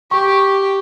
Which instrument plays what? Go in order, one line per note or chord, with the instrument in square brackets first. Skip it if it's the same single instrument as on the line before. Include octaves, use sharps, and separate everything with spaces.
[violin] G4 [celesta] C#6